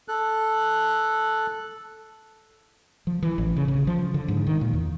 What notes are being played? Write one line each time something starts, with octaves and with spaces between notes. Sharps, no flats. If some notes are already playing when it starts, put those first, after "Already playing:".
A4 F#6
F3
E3
A1
C#3
C#3
F3
D3
G#2
D#3
A#2
E2